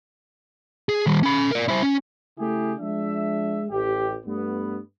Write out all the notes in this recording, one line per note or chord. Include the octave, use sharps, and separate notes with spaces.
G#4
D#3 G3
C#4 B5
A#4 D5
E4 C5
C#4
C#3 A3 E4 G4 G#4
F3 G#3 D4 E5
A1 G4
G2 A3 B3